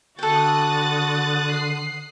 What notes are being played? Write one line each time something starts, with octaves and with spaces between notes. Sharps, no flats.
D3 F#4 A4 G5 D#6 F#6 A6
C7